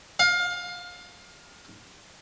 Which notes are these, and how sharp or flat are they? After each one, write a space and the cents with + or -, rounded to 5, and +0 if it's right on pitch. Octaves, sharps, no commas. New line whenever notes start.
F5 +25